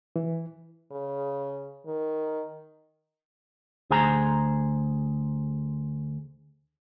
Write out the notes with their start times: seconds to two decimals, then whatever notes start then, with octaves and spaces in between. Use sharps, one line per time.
0.16 E3
0.92 C#3
1.87 D#3
3.91 D2 G#4 C5 G#5 A#5